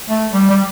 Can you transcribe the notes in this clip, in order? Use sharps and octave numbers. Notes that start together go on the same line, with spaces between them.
A3
G3
G3